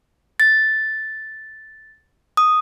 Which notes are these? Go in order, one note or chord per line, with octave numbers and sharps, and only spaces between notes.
A6
D#6